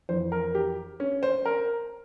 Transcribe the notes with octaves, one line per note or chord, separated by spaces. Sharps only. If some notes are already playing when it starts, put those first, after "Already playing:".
F2 E3 C5
A#4
G4
C#4
C5
A#4